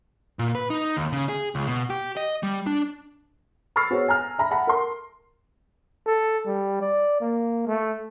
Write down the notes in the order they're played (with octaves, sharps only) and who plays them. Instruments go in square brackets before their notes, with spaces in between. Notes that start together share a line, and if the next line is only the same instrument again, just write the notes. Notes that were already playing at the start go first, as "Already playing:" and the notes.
[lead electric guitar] A#2
B4
D#4
D#2
C#3
G#4
C#2
B2
G4
D#5
G3
D4
[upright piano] B5 C#6 E6 F6 A6 C7
B3 F#4 G#4 C5 C#5
G#5 A#5 F6
E5 A#5 B5
E5 F#5 A5 B5
A#4 C6
[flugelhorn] A4
G3
D5
A#3
A3